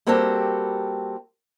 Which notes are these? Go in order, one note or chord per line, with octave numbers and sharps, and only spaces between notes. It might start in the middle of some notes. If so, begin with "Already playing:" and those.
G3 A#3 C4 F#4 G4 A4